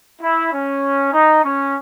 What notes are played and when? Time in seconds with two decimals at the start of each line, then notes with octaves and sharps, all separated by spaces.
0.22 E4
0.53 C#4
1.13 D#4
1.44 C#4